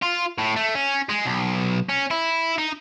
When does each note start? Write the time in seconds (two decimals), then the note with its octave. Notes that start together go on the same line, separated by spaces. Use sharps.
0.03 F4
0.39 A2
0.56 A3
0.75 C#4
1.09 G#3
1.25 B1
1.89 C#4
2.11 E4
2.58 D#4